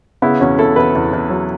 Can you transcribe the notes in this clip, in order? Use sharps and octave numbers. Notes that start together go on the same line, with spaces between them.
C#3 B3 E4
E2 C#4 F#4
E2 E4 A4
E2 F#4 B4
E2
E2
F#3